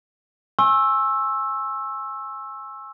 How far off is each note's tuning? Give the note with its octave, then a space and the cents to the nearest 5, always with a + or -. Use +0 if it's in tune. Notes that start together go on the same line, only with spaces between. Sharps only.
G#5 +0 C#6 -45 E6 +0